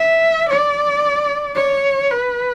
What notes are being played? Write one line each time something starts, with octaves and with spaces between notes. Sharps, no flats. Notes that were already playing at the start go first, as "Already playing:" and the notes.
Already playing: E5
D5
C#5
B4